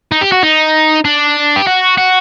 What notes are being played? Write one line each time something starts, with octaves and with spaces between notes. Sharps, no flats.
D#4
G4
F#4
D#4
D4
G4
F#4
F#4